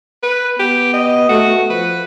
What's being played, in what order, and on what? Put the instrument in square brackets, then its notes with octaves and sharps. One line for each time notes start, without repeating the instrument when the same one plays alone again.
[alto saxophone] B4
[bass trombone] B3 [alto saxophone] G4
[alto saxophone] D#5
[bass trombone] A3 [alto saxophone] F#4
[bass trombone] F3 [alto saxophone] B4